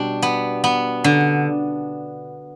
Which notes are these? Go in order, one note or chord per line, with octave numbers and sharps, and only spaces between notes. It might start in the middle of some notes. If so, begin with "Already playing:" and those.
Already playing: B2 G3 D4
B3
B3
D3